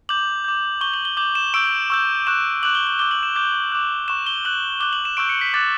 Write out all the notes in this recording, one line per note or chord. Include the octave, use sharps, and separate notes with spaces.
D6 G6 F#7
D6 G6
C#6 G6 G7
F#7
G7
D6 G6 F#7
E7
C#6 E6 G6 D7
C#6 E6 G6
C#6 F#6 E7
D6 F#6 F#7
G7
F#7
D6 F#6 G7
F#7
E7
D6 G6
D6 F#6
C#6 F#6 E7
G7
D6 F#6 F#7
D6 F#6 G7
F#7
E7
C#6 E6 G6 D7
C#7
B6
D6 F#6 A6